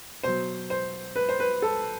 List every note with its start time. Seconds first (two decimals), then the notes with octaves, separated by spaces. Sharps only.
0.23 B2 F#3 C5
0.70 C5
1.16 B4
1.29 C5
1.40 B4
1.62 A4